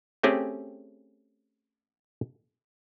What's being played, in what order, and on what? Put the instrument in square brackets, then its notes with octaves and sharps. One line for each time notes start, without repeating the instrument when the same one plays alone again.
[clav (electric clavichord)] A3 C4 C#4 G4 G#4